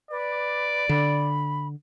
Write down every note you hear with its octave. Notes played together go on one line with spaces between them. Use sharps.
B4 D5
D3 B5